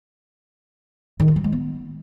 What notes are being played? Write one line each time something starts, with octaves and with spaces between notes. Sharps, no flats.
D#3
F4
F#3
G#3
B3